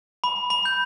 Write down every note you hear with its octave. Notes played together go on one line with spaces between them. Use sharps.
B5
B5
G6